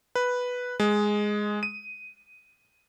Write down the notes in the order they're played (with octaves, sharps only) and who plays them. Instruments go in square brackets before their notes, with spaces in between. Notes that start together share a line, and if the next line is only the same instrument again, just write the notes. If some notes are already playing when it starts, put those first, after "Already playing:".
[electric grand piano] B4
G#3
D#7